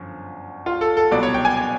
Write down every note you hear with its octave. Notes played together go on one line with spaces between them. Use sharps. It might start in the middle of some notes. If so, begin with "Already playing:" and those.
Already playing: G1 F#2 F3
F4
A4
A4
C2 B2 F#3 D5
C#5
G5
G#5
G#5